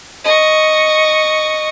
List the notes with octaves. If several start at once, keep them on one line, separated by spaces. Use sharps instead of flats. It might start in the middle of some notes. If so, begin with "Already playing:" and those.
D#5 C#6